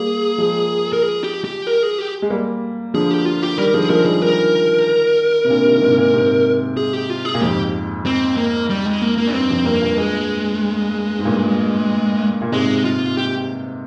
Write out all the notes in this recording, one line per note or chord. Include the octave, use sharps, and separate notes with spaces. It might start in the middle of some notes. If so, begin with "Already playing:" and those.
Already playing: G3 A#3 G#4
F3 G#3
A#4
G#4
G4
G4
A#4
G#4
G4
G#3
G3 A#3
D3 F3 G#4
G4
F4
G4
D#3 G3 A#4
D3 F3 G#4
F3 G#3 A#4
D#3 G3 G#4
D#3 G3 A#4
C3
A#2 D3
C3 D#3
D3
G#2 C3
A#2 D3
G#2 C3
G#4
G4
F4
G#4
A#2
F2 G#2 G4
C4
A#3
G3
G#3
A#3
A#3
D4
G2 C4
F2
G2 A#3
G2 A#2
G#3
G#2
G2 A#2
A#2
G#2 C3 G#3
F4
G4